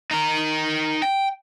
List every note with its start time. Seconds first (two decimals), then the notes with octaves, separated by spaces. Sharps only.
0.11 D#4 A#4
1.02 G5